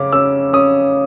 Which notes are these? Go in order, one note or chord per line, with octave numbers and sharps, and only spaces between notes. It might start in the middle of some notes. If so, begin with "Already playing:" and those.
Already playing: C#3 C#4 D6
C#4 E6
C#4 D#6